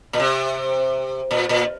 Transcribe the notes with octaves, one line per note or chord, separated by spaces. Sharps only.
A#2
C3
A#2
A#2